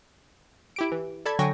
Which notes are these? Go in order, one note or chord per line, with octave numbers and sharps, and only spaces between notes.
E4 G4 D7
E3
A4 D5 A5 B5 G#6
D3 F#3 G5 G#5 C#6 A#6